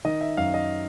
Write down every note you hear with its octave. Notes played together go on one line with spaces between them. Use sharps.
D#3 D#5
E5
F#2 F5
D#5